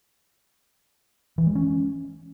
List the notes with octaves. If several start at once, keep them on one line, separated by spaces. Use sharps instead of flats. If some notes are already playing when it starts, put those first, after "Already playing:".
E3
G#3
C#4